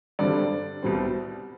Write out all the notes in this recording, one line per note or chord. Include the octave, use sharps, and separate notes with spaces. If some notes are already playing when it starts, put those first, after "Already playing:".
G2 D3 G3 C4 D5
C2 B2 G3 C4